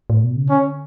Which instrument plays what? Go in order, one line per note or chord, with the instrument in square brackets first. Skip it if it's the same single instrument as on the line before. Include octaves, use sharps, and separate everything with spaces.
[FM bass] A2
B2
C#3
[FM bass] D3 [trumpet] C#4